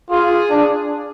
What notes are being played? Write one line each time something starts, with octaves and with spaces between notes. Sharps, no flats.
F4 G#4
D4